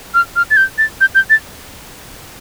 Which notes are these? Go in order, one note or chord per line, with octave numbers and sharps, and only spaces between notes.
F6
F6
A6
G6
A6
G6
G6
A6